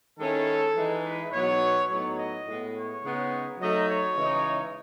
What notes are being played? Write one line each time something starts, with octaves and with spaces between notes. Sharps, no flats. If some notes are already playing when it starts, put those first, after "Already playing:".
D#3 G#3 C#4 E4 A4
E3 G#3 D#4
B4
B2 F#3 B3 D#4 C#5
A2 F#3 B3 D#4 C#5
D#5
A2 G#3 B3
C#5
C#3 G#3 B3 D#4
F#3 A3 D#4 D#5
C#5
C#3 E3 G#3 D#4